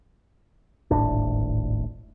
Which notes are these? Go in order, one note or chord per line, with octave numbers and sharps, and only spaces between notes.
D#1 G#1 A2 D4